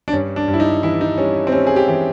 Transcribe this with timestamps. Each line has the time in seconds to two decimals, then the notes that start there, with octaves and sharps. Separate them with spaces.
0.08 D4
0.13 G2 C#4
0.36 D4
0.48 G2
0.54 E4
0.60 D#4
0.83 E3 E4
1.01 D#4
1.18 G3 C#4
1.47 C4
1.52 G3 C#4
1.67 G#4
1.76 G4
1.88 E3